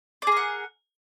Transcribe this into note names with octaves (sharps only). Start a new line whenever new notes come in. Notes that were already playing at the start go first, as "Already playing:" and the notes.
G#4 A#4 D5 F#5